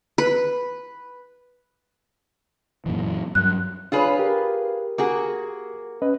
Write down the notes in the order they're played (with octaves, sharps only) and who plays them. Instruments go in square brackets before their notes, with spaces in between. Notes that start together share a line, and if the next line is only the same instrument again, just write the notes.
[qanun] B4
[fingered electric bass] F#2 A#2 E3
[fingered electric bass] G2 F#3 [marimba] F#6
[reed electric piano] D4 C#5 [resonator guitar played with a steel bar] F4 G#4 B4
[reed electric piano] G4 A#4
[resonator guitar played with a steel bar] A#3 F#4 G#4
[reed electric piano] C#4 B4 D#5